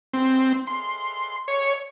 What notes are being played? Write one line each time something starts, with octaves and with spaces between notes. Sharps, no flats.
C4
C6
C#5